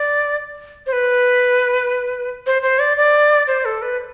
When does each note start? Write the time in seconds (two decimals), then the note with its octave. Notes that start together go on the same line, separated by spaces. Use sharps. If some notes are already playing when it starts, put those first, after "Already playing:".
Already playing: D5
0.87 C5
0.93 B4
2.46 C5
2.62 C5
2.79 D5
2.97 D5
3.47 C5
3.65 A4
3.82 B4